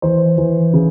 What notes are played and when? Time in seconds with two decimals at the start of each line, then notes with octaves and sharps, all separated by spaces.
0.02 E3 C5
0.38 E3
0.73 C#3